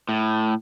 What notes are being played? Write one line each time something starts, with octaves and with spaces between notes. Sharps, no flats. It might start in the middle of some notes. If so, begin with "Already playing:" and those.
A2